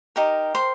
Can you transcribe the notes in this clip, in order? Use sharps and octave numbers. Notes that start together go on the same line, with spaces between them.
D#4 G4 A#4
C5 C6